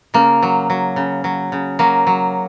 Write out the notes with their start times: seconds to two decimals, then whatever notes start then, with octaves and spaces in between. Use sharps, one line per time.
0.14 C#3 A#3
0.42 F#3
0.70 F#3
0.96 C#3
1.24 F#3
1.52 C#3
1.79 F#3 A#3
2.07 F#3